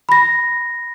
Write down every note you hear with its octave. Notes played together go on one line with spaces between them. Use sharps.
B5 A#6